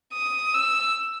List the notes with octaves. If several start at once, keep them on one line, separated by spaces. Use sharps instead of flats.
D#6
E6